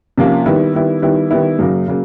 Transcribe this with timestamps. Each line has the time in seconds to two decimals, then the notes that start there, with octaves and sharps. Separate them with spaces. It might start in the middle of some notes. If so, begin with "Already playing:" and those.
0.18 C3 F3 A#3 C#4
0.46 D#3 G3 B3 E4
0.74 D#3 G3 B3 E4
1.02 D#3 G3 B3 E4
1.31 D#3 G3 B3 E4
1.59 F#2 C#3 F#3 A#3
1.88 C#3 F#3 A#3